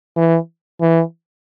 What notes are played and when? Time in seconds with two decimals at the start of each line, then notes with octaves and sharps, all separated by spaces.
0.17 E3
0.81 E3